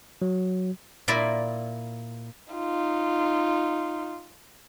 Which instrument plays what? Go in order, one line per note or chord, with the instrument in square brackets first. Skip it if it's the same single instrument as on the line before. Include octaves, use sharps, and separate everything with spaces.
[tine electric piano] F#3
[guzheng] A#2 A#3 E4 D5
[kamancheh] D#4 F4